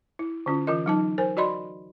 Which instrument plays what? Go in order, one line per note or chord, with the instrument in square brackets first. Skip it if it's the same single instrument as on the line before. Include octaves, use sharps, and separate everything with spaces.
[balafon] E4
D3 C#4 F4
E3 F4 A#4 D#5
F#3 D#4 A5
A#4 C5 G#5
F#4 D5 D#5 B5 C6